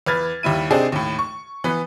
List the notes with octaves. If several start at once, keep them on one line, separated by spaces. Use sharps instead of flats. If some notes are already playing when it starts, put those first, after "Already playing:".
E2 B4 F6 G#6 A6
D#2 G3 E4 D#7
C3 C4 D4 D#4 G#4
D#2 A2
C#6
E3 B3